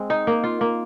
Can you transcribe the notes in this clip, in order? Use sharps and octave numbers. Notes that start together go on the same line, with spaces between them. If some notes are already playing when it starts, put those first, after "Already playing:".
Already playing: G#3 C4
D#4
A#3
F4
A#3